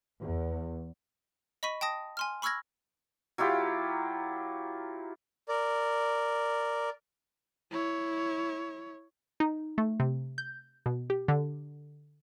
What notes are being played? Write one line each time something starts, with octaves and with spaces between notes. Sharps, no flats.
E2
D#5 B5 C#6 B6 D#7
G5 A5 D#6 A#6
G#5 C6 F6
B5 C#6 E6 F6 G#6 A#6
F#3 E4 F4 G4
A#4 D5
E4 C#5
D#4
A3
C3
G6
B2
G4
D3